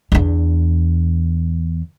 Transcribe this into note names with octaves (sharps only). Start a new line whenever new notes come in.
E2 D4